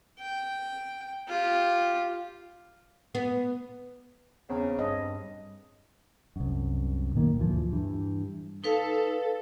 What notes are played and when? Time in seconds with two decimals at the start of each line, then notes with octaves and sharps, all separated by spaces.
0.19 G5
1.28 F4 G4
3.15 B3
4.50 E2 C#3 C4 C#4
4.79 G2 C4 D#5
6.36 C2 F#2
7.15 A#2 D#3 A#3
7.38 D2 G2 E3 F3
7.72 G2 E3
8.64 D#4 A4 B4 F5